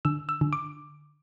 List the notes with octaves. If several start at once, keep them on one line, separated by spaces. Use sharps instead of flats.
D3 E6
E6
D3
D6